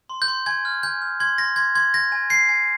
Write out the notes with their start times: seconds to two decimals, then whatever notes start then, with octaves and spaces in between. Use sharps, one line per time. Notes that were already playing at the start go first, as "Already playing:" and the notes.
0.09 C6
0.22 G6
0.28 C6
0.46 G#5 G#6
0.65 F6
0.83 G#5 G6
1.02 F6
1.20 C6 G#6
1.38 C6 A#6
1.56 C6 G#6
1.75 C6 G#6
1.94 G6 A#6
2.12 G#5
2.30 G6 C7
2.49 G#5